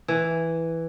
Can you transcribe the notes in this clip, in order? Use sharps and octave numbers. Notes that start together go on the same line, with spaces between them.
E3